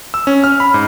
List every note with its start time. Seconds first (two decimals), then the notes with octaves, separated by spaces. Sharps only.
0.14 E6
0.27 C#4
0.44 F6
0.60 B5
0.74 G#2